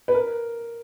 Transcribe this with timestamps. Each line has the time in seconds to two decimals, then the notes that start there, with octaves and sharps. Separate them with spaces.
0.08 B4
0.14 A#4